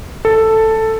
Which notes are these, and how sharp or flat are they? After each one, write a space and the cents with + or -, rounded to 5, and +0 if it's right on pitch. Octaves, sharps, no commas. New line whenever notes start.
A4 +5